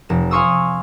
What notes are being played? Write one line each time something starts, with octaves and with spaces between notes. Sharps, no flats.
F1 E7
F5 G#5 C6 C#6 D#6 E6